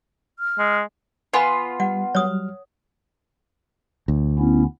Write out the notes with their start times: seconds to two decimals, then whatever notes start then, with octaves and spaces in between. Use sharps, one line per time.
0.39 F6
0.59 G#3
1.33 B3 F4 B4 G#5 B5
1.80 G3 F#5
2.15 F#3 G3 C#5 D#6 F6
4.08 D2
4.39 B3 C#4 E4